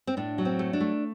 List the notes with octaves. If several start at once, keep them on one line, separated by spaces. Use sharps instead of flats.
C4
A2 D4
F#3
C4
A3
D4
A3